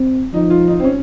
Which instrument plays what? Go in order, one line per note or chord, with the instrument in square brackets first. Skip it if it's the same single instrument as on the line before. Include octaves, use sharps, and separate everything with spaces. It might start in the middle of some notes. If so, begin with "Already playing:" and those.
Already playing: [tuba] C4
[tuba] F3 [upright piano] D#4
[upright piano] F4
D#4
C4
C#4